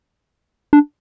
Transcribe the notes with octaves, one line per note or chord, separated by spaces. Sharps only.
D4